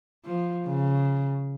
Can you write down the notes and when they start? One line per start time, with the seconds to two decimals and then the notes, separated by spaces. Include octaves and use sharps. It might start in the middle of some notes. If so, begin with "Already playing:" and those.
0.25 F3
0.66 C#3